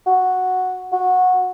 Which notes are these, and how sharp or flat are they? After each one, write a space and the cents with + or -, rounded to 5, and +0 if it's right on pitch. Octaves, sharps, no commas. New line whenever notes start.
F#4 -5
F#4 -15